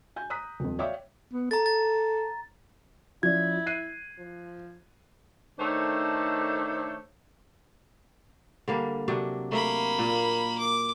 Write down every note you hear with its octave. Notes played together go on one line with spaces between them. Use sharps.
G#5 G6
A#5 D#6 F#6 B6
D#1 F2
C#5 D5 E5 F5 G5 D6
B3
A4 A#5 A6
A6
F3 C#4 E4 D5 G#6
F#6 C7 D#7
F3
D#3 A3 D4 A4 C5 C#5
D3 G3 A#3
C3 F#3 D4
A3 A#3 E5 B5
A#2
D6